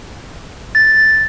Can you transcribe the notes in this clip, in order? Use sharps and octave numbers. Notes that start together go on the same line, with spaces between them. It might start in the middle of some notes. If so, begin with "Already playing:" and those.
A6